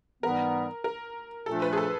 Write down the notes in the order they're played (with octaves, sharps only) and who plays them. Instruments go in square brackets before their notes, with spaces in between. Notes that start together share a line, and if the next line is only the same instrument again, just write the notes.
[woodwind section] G#2 E3 G3 B3 [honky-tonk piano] A#4
[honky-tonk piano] A#4
[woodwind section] A#2 F3 A3 D4 F4 [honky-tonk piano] A4
[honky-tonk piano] B4
G#4
A4